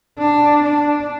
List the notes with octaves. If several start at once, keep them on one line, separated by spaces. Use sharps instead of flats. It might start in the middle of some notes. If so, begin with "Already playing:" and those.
D4
D4